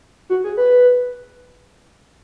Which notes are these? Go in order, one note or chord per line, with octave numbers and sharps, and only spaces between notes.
F#4
G#4
B4